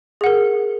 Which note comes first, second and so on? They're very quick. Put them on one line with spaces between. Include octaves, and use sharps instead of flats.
G#4 F#5 A#4